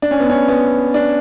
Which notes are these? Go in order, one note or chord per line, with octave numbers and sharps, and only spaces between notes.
D4
C#4
B3
C#4
B3
D4